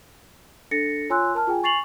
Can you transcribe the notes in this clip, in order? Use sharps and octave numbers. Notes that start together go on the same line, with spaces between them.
D4 A4 A6 A#6 C#7
F4 C#5 G#5 C6 E6 F#6
A#4 A5 F6
F4 G#4 G5 G#5
G#5 C#6 A6 C7 F7 F#7